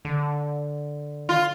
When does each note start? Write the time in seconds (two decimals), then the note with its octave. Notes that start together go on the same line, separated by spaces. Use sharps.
0.05 D3
1.29 F4